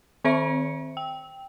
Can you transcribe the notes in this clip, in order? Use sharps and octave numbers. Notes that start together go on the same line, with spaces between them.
D#3 C4 C5 E5 C#7
G5